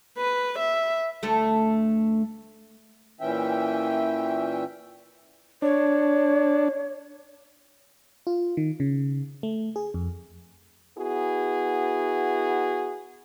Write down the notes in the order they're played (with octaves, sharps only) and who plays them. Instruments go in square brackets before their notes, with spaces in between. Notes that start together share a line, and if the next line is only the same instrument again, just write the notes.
[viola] B4
E5
[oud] D2 A3 A4
[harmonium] A#2 E3 C#4 E5 G5
[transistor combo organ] D4 [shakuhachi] C#5
[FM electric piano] F4
D#3
C#3
A3
G#4
F2
[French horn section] B3 E4 F#4 G#4